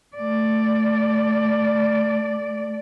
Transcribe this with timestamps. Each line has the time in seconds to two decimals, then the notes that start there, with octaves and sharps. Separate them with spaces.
0.16 A3 D5